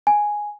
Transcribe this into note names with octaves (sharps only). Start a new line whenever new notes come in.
G#5